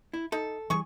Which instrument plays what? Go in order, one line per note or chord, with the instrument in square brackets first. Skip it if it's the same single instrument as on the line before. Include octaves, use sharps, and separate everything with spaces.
[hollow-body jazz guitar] E4
[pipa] D#4 [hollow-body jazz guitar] A4
[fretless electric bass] E3 F3 G3 [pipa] G#4 C#6